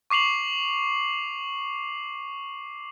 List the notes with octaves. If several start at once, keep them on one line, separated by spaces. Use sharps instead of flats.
C#6 D6 C7 F7 F#7